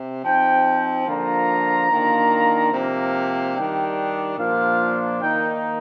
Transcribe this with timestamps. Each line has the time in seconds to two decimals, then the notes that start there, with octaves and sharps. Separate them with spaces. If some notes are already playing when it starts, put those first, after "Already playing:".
Already playing: C3
0.24 F3 C4 D#4 G5
1.07 D3 F3 A#3 F4 A#5
1.91 D#3 A#3 D4 F4
2.73 C3 F3 A#3
3.55 D#3 G3 D4 G5
4.38 A#2 F3 A#3 D4 F4 F5
5.20 D#3 A#3 D#4 G5